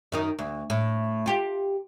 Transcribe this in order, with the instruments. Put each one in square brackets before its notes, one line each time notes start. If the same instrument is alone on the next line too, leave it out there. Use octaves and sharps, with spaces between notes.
[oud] F#2 D#3 D#4
D2
A2
F4 G4